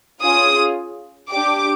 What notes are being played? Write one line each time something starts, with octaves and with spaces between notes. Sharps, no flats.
C#4 F4 G#4 D#6
D4 G4 D6